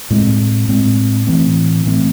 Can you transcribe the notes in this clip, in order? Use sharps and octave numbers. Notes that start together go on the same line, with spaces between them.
A2 G#3 C4
A2 G#3 C4
A2 E3 A3 C4
A2 E3 A3 C4